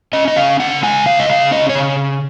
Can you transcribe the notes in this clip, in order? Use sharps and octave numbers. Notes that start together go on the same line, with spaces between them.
C#4 D#5
D#5
C#3 F5
C#3 F#5
G#3 G#5
C#3 F5
D#5
C#3 F5
C#4 D#5
C#5
C#3